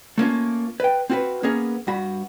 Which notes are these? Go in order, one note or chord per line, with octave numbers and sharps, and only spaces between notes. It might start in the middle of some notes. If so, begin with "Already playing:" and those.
A3 A#3 C#4 F4
B4 G5
C4 F4 F#4 A4 B4
A#3 B3 C#4 G#4 A#4
G2 F#4 B5